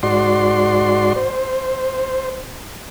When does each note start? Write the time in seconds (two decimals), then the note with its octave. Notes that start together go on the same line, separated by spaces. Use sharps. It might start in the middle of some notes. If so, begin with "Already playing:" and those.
0.03 G#2 F#4 D5 C6
1.16 C5